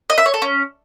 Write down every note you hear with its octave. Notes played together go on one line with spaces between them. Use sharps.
D#5
E5
C#5
A4
C#4